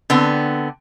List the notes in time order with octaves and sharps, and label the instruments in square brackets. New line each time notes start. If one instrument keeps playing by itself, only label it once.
[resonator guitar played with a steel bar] D3 B3 C4